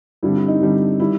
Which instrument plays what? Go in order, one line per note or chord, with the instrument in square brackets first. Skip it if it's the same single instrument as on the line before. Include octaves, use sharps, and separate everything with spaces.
[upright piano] G2 D3 G3 C4 E4
E4
D#4
G2 D3 G3 C4
D#3 G3 E4